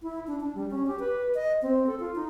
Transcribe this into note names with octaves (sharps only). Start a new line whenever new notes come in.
E4
D4
D4
G3
C#4
G4
B4
D#5
C4
A4
F4
D#4